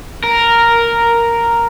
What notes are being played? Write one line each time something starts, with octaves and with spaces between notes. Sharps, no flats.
A#4